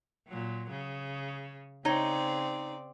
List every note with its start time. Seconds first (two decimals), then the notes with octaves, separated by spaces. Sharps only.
0.28 A#2 F#3
0.70 C#3
1.85 C#3 C4 D#4 C#5 D5